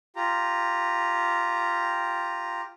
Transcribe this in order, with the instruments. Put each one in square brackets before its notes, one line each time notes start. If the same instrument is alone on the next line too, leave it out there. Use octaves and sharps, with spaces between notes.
[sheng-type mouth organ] F4 G4 A#5